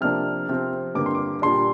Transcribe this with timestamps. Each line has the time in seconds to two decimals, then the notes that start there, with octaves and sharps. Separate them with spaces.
0.01 C3 F3 A#3 D4 F6
0.48 C3 F3 C4
0.95 G2 D3 A#3 D6
1.06 C6
1.15 D6
1.42 A#2 G3 D4 C6